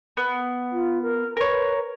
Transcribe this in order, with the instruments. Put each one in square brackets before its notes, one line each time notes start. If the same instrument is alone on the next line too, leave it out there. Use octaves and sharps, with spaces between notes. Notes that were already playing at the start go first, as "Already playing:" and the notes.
[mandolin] B3
[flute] F4
A#4
[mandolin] A#4 C#5 [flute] B4